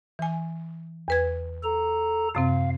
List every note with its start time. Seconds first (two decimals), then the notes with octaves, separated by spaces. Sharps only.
0.19 E3 G#5
1.08 E2 B4 G#6
1.64 A4 A#5
2.35 F#2 C3 C4 F5